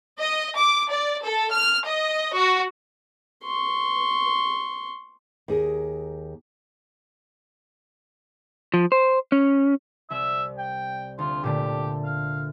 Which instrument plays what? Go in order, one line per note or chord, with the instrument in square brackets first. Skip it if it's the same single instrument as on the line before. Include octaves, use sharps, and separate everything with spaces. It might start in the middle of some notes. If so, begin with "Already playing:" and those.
[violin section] D#5
D6
D5
A4
F6
D#5
F#4
[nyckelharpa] C6 C#6
[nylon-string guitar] D#2 G#4 A#4
[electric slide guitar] F3
C5
C#4
[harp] C2 [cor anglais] E5
[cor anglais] G5
[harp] D2 [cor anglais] F4
[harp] A#2 D3 A3 [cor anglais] G4
[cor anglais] F5